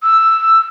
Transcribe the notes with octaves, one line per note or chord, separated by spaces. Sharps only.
E6